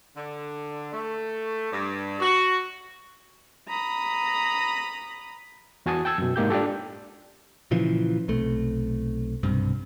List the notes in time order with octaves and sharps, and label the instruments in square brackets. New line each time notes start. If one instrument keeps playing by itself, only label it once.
[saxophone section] D3
A3
G2
F#4
[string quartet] A#5 B5 D#6
[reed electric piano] E2 F#4 G#5 A5 D#6
G5 A5 E6 G#6
F#2 B2
G#2 A#3 G4 G6
D4 F4 G4 A4
[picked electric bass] A#2 C#3 E3 F3
B1 C3 A3
B1 G2 C3